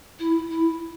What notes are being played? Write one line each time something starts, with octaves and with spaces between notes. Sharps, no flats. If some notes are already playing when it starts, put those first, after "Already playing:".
E4
E4